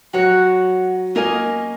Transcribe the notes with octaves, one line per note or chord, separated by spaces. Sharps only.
F#3 F#4 C#5 F#5
A#3 C#4 A#4 D#5 G#5